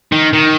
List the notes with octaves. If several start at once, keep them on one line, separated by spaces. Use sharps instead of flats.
D#3
D#3